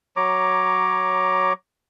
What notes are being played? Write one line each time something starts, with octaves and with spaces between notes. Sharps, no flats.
F#3 C#5 A#5 D6